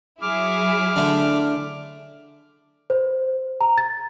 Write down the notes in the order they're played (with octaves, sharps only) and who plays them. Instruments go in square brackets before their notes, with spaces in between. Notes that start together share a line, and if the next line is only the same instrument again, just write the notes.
[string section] F#3 E4 G#4 [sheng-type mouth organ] D6 F6
[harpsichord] D3 A3
[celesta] C5
A#5
A6